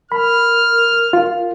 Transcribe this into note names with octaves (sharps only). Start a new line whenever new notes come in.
A#4 B5 F6
F4